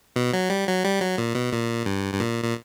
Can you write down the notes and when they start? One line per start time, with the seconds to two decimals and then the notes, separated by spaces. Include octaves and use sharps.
0.16 B2
0.33 F#3
0.50 G3
0.67 F#3
0.84 G3
1.01 F#3
1.18 A#2
1.35 B2
1.52 A#2
1.86 G2
2.14 G2
2.20 A#2
2.44 A#2